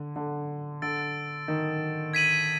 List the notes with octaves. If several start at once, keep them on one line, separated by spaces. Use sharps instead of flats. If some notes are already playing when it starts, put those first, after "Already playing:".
Already playing: D3
D3
D3 E6 A6 D7
D#3
G#6 B6 D#7 F#7